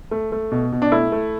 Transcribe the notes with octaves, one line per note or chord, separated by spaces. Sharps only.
A3
A3
B2
B2
D4
A3 E4
A3